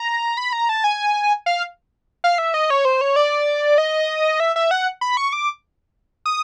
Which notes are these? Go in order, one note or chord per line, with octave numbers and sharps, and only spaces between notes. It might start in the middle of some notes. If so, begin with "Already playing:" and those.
Already playing: A#5
B5
A#5
A5
G#5
F5
F5
E5
D#5
C#5
C5
C#5
D5
D#5
E5
E5
F#5
B5
C#6
D6
D#6